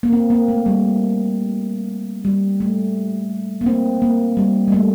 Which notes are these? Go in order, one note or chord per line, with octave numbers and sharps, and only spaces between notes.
A#3
C4
A#3
A3
G3
G3
A3
A#3
C4
A#3
G3
G3
A3